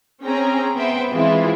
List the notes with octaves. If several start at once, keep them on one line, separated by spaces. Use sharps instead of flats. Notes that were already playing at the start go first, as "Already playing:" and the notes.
C4 C#4 G#4 G5 A#5
B3 B4 C5 E5 G5
E3 G#3 C4 E4 F4